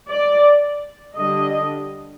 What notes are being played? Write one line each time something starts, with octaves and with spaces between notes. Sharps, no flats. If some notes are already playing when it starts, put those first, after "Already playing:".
D5
D3 G3 D4 D#5